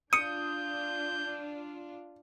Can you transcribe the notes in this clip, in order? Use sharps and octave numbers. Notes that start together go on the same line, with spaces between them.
D4 F4 D#6 G6 C#7 D#7